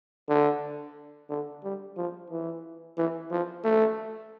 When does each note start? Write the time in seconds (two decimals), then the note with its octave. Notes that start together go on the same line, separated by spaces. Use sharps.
0.29 D3
1.30 D3
1.64 G3
1.97 F3
2.30 E3
2.97 E3
3.31 F3
3.64 A3